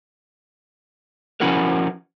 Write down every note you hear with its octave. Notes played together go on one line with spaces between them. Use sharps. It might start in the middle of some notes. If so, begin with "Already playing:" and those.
F3 C#4 E4 F#4 A#4 B4